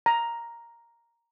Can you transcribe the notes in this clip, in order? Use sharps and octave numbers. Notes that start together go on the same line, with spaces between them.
A#5